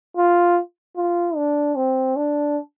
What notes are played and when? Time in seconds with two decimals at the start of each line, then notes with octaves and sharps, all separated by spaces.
0.17 F4
0.96 F4
1.36 D4
1.75 C4
2.16 D4